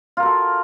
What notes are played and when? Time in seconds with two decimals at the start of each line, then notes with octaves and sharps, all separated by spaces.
0.17 F4
0.20 A#4
0.23 F#4
0.26 A4